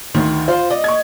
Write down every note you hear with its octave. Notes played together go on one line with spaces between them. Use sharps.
D2 D#3 F4
F4 C5
D5 D#5
C#6 G#6